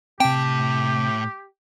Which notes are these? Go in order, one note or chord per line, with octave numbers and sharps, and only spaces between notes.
A2 C3 C4 G4 G5 A5